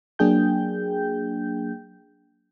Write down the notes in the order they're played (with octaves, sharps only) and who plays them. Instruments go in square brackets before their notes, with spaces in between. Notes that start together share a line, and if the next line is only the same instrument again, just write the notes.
[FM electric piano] F#3 A#3 D4 G#4 G5 G6